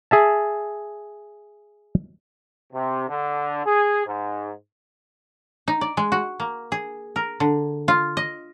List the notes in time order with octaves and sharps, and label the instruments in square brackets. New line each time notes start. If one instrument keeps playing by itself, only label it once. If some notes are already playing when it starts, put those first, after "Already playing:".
[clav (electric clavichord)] G#4 E5 A5
[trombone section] C3
D3
G#4
G#2
[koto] D#4
D5
G#3
F#4
A#3
G#4
A#4
D3
F4
D#5